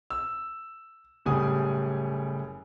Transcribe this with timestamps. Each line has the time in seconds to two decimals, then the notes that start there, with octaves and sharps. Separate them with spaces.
0.10 E6
1.25 F#1 A2 G3 G#5 D#6